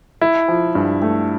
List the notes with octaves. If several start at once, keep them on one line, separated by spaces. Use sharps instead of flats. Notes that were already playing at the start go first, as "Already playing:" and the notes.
E4
F3
G2
A3